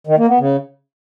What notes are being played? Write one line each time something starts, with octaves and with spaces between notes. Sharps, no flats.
D#3
A#3
B3
C#3